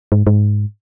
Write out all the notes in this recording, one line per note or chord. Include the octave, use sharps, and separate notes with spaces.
G#2
G#2